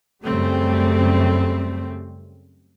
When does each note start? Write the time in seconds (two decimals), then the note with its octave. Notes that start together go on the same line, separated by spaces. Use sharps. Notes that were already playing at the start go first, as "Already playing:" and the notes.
0.24 F#2 C#3 G3 A3 C4